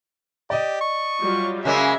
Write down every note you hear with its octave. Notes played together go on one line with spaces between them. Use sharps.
G4 D5 D#5
C#6
F#3 G3 F4
C#3 G#3 A#3 G#4 E5